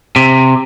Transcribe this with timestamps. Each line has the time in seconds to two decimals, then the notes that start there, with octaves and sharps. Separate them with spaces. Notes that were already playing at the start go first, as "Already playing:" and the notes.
0.16 C3